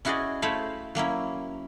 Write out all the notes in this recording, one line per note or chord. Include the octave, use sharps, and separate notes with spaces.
C#4 E4 F#4 G#4 D5 D#5
A3 E4 C5 C#5 F5 B5
F#3 A#3 C#4 E4